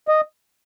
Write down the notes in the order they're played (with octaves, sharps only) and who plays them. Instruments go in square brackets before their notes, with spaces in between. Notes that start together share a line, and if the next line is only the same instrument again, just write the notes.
[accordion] D#5